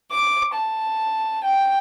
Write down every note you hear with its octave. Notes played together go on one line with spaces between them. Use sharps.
D6
A5
G5